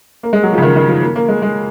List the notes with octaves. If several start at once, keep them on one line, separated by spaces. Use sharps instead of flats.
A#3
G#3
F#3
F3
C#3
D#3
D#3
F3
A#3
A#3
G#3
G#3